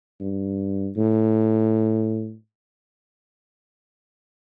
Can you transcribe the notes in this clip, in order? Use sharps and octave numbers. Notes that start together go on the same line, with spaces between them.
G2
A2